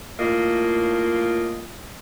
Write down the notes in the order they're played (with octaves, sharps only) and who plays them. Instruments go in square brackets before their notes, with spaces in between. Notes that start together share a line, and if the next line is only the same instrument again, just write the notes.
[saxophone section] A2 A#3 F4 D#5